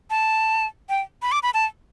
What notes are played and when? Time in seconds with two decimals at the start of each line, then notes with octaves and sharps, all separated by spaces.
0.10 A5
0.89 G5
1.22 B5
1.32 D6
1.43 B5
1.54 A5